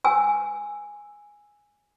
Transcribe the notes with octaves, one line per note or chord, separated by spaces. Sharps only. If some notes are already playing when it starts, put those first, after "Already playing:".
G#5 E6